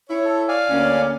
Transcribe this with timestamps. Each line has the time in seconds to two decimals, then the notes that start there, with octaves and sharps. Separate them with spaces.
0.10 E4 C#5
0.25 A4
0.48 D5 F5 G#5
0.69 D2 A#3 C#4